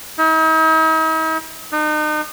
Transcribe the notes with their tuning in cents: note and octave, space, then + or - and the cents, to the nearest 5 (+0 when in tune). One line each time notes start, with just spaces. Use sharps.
D#4 +45
D#4 -35